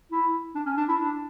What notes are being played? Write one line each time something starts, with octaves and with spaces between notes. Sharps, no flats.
E4
D4
C#4
D4
E4
D4